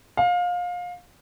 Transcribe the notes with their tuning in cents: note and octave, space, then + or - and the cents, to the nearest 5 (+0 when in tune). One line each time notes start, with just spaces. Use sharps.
F5 +25